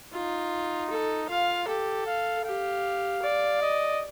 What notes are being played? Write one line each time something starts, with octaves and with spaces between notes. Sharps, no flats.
D#4 F4
A4
F4 F5
G4 A4
F5
G4 F5
D5
D#5